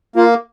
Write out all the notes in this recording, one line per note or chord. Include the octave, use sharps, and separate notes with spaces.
A#3 F4